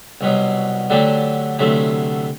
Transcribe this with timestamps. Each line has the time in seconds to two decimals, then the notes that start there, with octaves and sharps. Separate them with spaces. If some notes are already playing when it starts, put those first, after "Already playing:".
0.21 C2 B2 F#3
0.90 D3 F#3 A3 D4 G4
1.59 D2 C3 F#3 A3